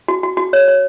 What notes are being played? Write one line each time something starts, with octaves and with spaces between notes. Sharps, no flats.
F#4
F#4
F#4
C#5
C#5